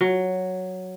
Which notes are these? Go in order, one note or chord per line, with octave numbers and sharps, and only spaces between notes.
F#3